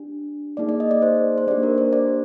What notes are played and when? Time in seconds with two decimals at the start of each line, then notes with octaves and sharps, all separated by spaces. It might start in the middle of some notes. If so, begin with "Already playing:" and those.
Already playing: D4 G4
0.57 A#3 D#4 G#4 D5
0.69 D5
0.80 D#5
0.91 D5
1.02 C5
1.38 C5
1.47 A#3 D4 G4 D5
1.63 A#4
1.78 C5
1.93 D5